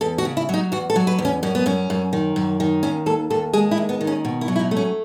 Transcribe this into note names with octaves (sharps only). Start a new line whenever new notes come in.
E2 A4
F#4
C#3
E4
F#3 D#4
E2 F#4
A4
F#3
B4
E2
C#4
F#2 C#4
B3
F#2 C#4
F#2
D#3
F#2
D#3
D#2 C#4
D#2 A4
D#2 A4
G#3 G#4
E4
D#2
B3
D#3
C#4
B2
E4
F#3
E4
D#4
A3
C#4